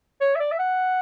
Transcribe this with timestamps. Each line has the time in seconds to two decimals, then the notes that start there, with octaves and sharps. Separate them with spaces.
0.21 C#5
0.35 E5
0.40 D5
0.52 E5
0.59 F#5